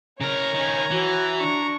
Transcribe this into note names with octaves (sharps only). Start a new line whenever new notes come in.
C#3 A#4 C#5 A#5 G#6
D#3 C#4
E3 F#4
D4 C#6